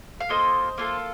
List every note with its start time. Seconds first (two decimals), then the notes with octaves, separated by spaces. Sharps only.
0.20 F5
0.29 A#3 F4 A4 C5 D#5
0.78 A#3 F4 A4